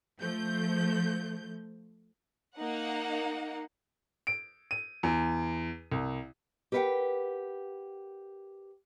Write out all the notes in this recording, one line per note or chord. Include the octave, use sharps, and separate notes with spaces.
F3 A3 G6
A#3 D#4 F#5
D7
D#7
E2
C2
G4 A#4 B4 D#5 F#5 G5